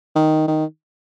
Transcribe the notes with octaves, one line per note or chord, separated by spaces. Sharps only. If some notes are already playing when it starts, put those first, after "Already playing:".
D#3
D#3